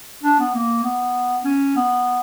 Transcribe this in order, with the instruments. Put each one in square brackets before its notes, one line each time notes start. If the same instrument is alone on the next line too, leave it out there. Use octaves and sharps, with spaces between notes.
[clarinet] D4
B3
A#3
B3
C#4
B3